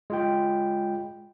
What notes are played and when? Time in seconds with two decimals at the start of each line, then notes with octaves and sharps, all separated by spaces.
0.10 G#3 F4 G5